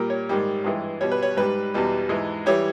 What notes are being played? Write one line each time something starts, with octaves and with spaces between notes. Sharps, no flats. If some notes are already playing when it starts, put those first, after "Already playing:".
Already playing: A#2 G3 A#4
C#5
G#2 D#3 G3
G2 E3 G#3
B2 G3 C#5
B4
C#5
G#2 G3 B4
E2 B2 G3
G#2 E3 G#3
E3 G3 C#5